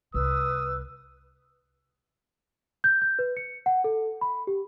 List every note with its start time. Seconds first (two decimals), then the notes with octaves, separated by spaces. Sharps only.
0.14 C2 B4 D#6 E6
2.84 G6
3.02 G6
3.19 B4
3.37 C#7
3.66 F#5
3.84 A4
4.21 B5
4.47 G4